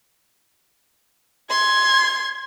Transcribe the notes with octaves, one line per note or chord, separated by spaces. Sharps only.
C6 G#6